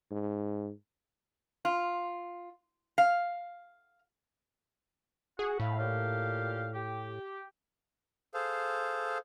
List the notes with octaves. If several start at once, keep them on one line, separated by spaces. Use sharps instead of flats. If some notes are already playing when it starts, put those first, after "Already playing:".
G#2
F4
F5
F#4 G#4 F#5
A2 F5 B5
A#2 G4 F5
G4
G#4 A4 C5 F5